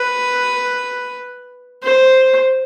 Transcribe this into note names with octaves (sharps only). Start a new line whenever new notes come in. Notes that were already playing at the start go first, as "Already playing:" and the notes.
Already playing: B4
C5